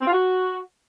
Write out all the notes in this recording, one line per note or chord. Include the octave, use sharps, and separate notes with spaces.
C4
F4
F#4